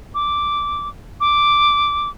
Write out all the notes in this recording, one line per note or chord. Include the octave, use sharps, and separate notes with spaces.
D6
D6